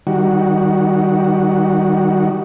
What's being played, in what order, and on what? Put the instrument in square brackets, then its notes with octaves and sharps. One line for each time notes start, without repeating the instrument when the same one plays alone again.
[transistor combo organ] D#3 G3 F#4